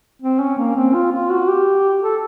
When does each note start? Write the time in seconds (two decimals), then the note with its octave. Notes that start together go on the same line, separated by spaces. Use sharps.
0.22 C4
0.40 C#4
0.58 A#3
0.76 C4
0.94 F4
1.12 F4
1.30 F#4
1.49 G4
2.03 A4